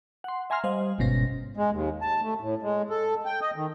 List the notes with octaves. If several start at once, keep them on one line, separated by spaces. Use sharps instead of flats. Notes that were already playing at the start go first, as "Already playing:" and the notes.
F#5 C6
E5 G#5 A#5 C6 F6
G3 C5 D#5 F5
G1 G#2 B2 C#4 A#6
G#3
D#2
A5
A3
A2
G#3
A4
G5
D#5
D#3